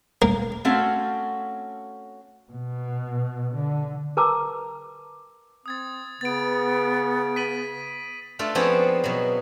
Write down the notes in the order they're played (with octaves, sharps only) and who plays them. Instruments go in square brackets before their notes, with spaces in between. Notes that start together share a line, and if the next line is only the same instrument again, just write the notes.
[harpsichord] A#3
[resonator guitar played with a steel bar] A3 C4 C#4 F#4 A4 F5
[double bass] B2
D3
[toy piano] A#4 B4 A5 A#5 D6 E6
[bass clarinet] C4 [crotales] D#6 G#6 A6
[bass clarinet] C#3 [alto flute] B3 [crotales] A6 D7
[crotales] B6 D#7 F#7
[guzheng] A3 D4 F4 A4
F3 B3 C4 D4 G#4 C#5
B2 F#3